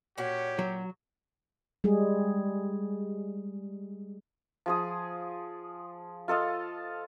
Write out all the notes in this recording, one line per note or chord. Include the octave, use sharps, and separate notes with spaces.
A#2 C#4 F#4 G4 C#5
F#3
G3 G#3 G#4
F3 G#4 D#6
F4 A4 D#5 F5